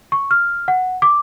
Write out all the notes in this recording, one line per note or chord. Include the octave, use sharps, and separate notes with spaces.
C#6
F6
F#5
D6